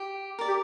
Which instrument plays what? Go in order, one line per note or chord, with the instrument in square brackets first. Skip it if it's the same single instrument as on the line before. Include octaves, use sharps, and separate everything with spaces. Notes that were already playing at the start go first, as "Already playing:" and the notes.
Already playing: [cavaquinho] G4
A#4 D5
[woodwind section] G4